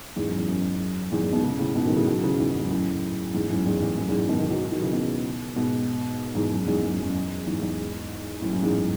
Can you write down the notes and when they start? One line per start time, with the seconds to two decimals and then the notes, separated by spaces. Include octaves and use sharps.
0.16 E2 G#2
0.27 F#2
0.38 E2
0.49 F#2
1.12 E2 G#2
1.22 E2
1.33 G#2 B2
1.43 A2 C#3
1.59 A2 C#3
1.75 G#2 B2
1.86 D#3 F#3
1.96 C#3 E3
2.07 D#3 F#3
2.23 C#3 E3
2.39 E2 G#2
2.52 E2
2.60 F#2
2.71 F#2 A2
3.34 E2 G#2
3.50 F#2 A2
3.66 E2 G#2
3.82 E2
3.98 F#2
4.08 E2 G#2
4.19 E2
4.29 B2 D#3
4.39 B2 D#3
4.50 D#3 F#3
4.72 D#3 F#3
4.82 C#3 E3
4.93 B2 D#3
5.56 G#2 B2
6.35 E2 G#2
6.51 F#2
6.67 E2 G#2
6.83 F#2
7.00 F#2
7.47 E2 G#2
7.62 E2 G#2
8.42 F#2 A2
8.53 F#2 A2
8.63 E2 G#2